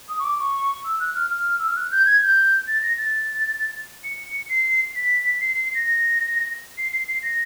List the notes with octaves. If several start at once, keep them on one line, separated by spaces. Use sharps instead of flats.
D#6
C#6
D6
C#6
E6
F#6
F6
F6
E6
F6
F#6
G6
G#6
G6
A6
A#6
A6
C#7
C7
B6
C7
C7
C7
A#6
C7
C7
C7
A#6